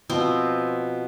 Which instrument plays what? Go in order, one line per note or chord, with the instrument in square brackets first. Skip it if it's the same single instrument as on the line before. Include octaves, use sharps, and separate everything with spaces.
[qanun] B2 F3 C4 C6